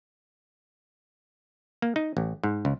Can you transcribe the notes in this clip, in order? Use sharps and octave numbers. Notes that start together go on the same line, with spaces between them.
A#3
D#4
A1
G#2
C#2